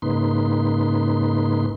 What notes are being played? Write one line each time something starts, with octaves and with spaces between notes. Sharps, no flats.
G#2 C#3 A#3 D#4 B4 C6